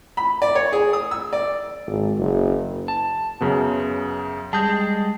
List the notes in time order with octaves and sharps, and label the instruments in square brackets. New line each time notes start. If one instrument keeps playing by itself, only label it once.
[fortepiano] B5
D5
C#5
G#4
D#6
E6
D5
[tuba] G#1
F#1
[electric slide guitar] A5
[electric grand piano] F#2 C#3 B3
[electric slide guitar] G3 G#3 [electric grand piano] A5 D#6 G6